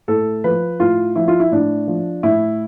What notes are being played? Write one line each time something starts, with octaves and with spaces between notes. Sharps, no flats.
A2 A4
F3 B4
A2 F4
F3 E4
F4
E4
A2 D4
F3
A2 E4